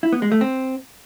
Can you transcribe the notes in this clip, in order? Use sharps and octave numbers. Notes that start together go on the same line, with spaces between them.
E4
B3
G#3
A3
C4